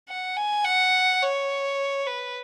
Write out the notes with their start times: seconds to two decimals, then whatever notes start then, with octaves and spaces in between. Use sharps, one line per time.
0.09 F#5
0.37 G#5
0.64 F#5
1.22 C#5
2.07 B4